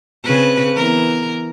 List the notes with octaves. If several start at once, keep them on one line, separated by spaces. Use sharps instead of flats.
C#3 C4 B4
E3 B3 A#4